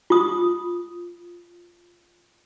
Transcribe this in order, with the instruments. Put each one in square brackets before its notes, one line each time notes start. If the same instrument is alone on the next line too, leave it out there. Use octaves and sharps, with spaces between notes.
[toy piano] F4 D#6